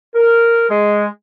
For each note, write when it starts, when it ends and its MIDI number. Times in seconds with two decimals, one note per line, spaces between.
0.15 0.69 70
0.70 1.07 56